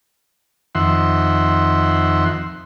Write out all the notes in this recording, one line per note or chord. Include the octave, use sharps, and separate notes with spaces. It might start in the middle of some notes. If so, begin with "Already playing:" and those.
F2 D#3 E5 F#5 C6